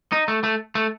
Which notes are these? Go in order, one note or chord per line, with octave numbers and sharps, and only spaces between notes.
D#4
A3
A3
A3